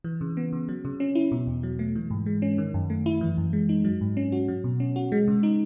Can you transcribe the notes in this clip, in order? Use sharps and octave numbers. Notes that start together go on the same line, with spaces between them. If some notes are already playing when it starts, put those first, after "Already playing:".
E3
C#3
B3
C#3
F#3
C#3
C#4
E4
B2
E2
F#3
A3
E3
G#2
G#3
C#4
D#3
F#2
A3
E4
E3
F#2
G#3
D#4
F#3
G#2
C#4
F#4
F#3
B2
C#4
F#4
G#3
C#3
D#4